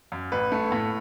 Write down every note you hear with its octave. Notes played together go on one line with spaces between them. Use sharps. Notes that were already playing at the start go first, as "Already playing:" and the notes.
F#2
A1 B4
A3
A2